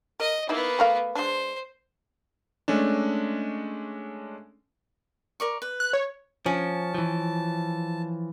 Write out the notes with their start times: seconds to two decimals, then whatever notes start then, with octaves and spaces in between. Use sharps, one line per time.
0.20 A#4 D#5
0.49 A#3 B3 D#4 E4 E5
0.79 A3 A#4 F5
1.15 G#3 D4 C5
2.68 G#3 A3 C#4 D4
5.40 A#4 D5 C#6
5.62 B4
5.80 F#6
5.93 C#5
6.46 F3 C#4 A5
6.95 E3 F3